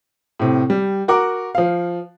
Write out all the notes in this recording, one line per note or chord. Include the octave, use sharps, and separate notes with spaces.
A2 C3
G3
F#4 A#4 F#5 D6
F3 F5